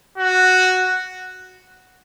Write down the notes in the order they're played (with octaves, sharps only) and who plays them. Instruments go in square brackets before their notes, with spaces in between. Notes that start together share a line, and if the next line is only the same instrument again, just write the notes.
[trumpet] F#4